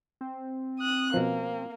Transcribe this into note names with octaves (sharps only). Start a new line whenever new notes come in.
C4
D#6 F#6
B2 F3 A#3